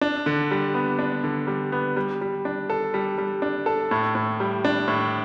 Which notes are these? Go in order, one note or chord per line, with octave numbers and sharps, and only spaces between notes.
D4
D3
G3
B3
D4
D3
G3
B3
G3
G3
D4
A4
G3
G3
D4
A4
A2
A2
G3
D4
A2